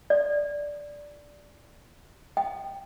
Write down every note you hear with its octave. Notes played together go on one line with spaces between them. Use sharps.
D5
G5